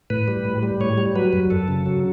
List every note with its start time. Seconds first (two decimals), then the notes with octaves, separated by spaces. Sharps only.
0.10 A2 B4
0.28 G3
0.45 A2
0.63 G3
0.80 A2 C#5
0.98 G3
1.16 F#3 B4
1.33 F#2
1.50 F#2 A4
1.68 C#3
1.86 F#3